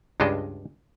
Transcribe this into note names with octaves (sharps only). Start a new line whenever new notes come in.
C#2 G2 G#3 D4 D#5